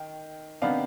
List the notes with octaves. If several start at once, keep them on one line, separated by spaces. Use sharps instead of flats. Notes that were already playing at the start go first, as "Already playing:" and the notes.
Already playing: D#3 G5
C3 D#3 B3 D4 F5